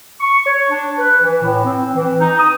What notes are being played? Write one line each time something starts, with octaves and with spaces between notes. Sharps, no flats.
C#6
C#5
D4
B4
E3
A2
C4
E3
D#4
D#6